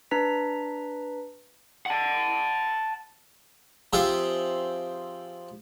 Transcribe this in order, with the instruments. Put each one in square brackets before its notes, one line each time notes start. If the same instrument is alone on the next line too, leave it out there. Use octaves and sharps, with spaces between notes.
[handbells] D4 B4 A#5 B6
[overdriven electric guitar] F#5 A5
[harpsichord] F3 C4 G4 G#4 E5 F5